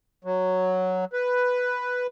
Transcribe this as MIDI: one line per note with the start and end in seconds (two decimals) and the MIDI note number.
0.25 1.05 54
1.13 2.07 71